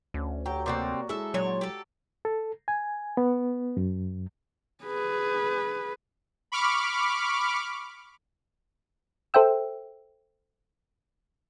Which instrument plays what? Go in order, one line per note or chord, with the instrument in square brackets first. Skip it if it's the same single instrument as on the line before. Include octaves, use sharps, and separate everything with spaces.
[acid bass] D2 [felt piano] C#4
[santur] F#3 [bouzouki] G4 [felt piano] G5
[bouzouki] C3 G3 C4 [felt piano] A#3 G4 [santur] F#4 D5
[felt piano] G#3 E4 [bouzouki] A4 E5
[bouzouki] A#2 C#5 [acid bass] F#3
[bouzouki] G4 A4
[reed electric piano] A4
G#5
B3
F#2
[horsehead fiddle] G#4 B4
[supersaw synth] B5 C#6 D6 F6
[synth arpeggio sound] A4 C5 E5 G5 E6